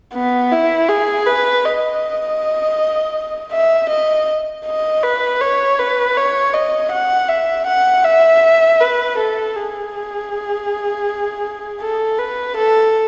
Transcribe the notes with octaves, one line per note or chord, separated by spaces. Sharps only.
B3
E4
G#4
B4
D#5
E5
D#5
D#5
B4
C#5
B4
C#5
D#5
F#5
E5
F#5
E5
B4
A4
G#4
A4
B4
A4